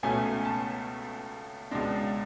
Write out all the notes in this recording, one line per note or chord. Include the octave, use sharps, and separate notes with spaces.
C#2 B2 A3 C#4 G#5
A5
C#2 B2 G#3 D4